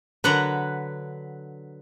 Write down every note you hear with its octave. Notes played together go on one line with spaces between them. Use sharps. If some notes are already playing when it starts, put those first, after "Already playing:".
D3 F#3 B4 F#5 A#5